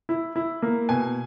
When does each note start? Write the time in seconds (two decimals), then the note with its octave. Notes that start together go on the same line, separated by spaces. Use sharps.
0.09 E4
0.36 E4
0.63 A#3
0.89 B2 G#5